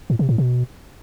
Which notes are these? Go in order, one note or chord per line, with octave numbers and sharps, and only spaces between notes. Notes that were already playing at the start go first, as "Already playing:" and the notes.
A2
C3
A2
B2